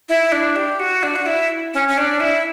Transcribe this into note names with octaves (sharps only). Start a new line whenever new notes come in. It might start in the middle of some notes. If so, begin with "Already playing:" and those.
E4
D4
G4
F#4
D4
F#4
E4
C#4
C#4
D4
E4